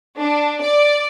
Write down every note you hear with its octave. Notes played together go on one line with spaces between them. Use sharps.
D4
D5